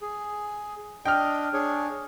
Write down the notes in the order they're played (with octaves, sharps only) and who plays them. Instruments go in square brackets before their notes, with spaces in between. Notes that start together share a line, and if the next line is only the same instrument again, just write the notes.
[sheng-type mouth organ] G#4
[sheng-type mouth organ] D4 D#5 [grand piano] G5 F6
[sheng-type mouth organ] D4 G#4 C#5